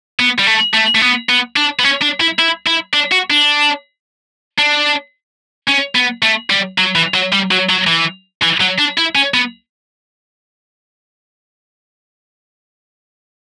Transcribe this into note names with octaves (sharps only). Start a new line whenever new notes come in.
B3
G3
A3
A3
A3
B3
B3
D4
B3
C#4
D4
E4
E4
E4
D4
F#4
D4
D4
C#4
B3
A3
G3
F#3
E3
F#3
G3
F#3
F#3
E3
E3
F#3
D4
E4
C#4
B3